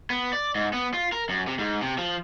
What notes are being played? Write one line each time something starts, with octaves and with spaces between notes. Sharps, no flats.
B3
D5
G#2
B3
F4
A#4
F#2
C3
G#2
C3
F3